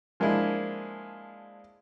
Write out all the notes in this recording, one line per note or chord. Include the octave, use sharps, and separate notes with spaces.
F3 G#3 A#3 D4 E4